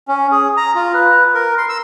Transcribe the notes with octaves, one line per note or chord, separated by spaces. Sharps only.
C#4
G#4
A#5
F4
B4
A#4
C6
E6